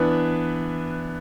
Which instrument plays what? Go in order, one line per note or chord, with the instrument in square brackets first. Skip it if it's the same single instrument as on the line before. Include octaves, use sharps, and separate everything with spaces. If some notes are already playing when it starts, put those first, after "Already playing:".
Already playing: [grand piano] E3 B3 D4 B4